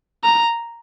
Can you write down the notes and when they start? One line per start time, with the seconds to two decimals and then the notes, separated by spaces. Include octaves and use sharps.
0.24 A#5